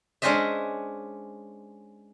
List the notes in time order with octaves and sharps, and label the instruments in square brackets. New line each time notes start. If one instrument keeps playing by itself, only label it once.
[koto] G#3 C#4 D4 C5 D#5 E5